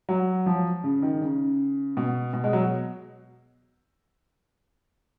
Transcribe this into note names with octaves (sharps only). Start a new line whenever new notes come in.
F#3
F3
C#3
D#3
C#3
B2
B2
G#3
F#3